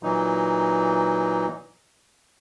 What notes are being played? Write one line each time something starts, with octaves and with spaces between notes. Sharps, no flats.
A#2 E3 F#3 D#4